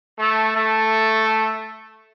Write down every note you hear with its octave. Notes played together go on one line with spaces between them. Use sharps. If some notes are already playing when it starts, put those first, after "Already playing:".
A3
A3